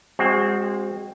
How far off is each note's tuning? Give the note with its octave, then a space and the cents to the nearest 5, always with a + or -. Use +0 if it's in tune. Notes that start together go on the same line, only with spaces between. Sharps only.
G#3 -30 C4 +0 F#4 +0